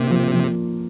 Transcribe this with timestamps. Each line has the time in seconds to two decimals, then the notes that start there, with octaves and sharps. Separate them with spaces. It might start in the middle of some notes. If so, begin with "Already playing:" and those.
Already playing: C3 A#3 D4
0.10 F3
0.33 F3